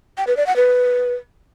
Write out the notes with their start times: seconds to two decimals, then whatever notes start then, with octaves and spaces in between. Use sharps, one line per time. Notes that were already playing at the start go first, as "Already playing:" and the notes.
0.18 G5
0.27 B4
0.37 D5
0.47 F#5
0.56 B4